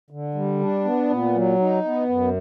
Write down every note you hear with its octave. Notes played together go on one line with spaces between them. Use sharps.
D3
G3
D4
B3
A#2
F#3
D#4
B3
F#2